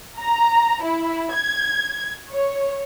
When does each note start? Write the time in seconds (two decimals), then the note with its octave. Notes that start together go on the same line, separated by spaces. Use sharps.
0.19 A#5
0.83 E4
1.34 G#6
2.32 C#5